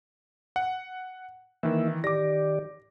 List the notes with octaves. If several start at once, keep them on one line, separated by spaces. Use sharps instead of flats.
F#5
D#3 E3 A#3 E4 E5
D#3 G4 D5 D6 A#6